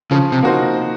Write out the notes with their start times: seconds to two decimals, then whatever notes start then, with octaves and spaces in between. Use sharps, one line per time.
0.11 C#3 F3
0.32 C3
0.43 A#3 D#4 F#4 C5